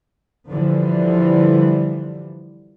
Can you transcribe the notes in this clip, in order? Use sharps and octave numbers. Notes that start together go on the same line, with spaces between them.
D3 E3 F3 G3